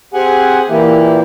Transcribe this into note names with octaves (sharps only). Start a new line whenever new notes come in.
C4 G4 G#4 F#5 G#5
A#2 E3 A#3 E4 G4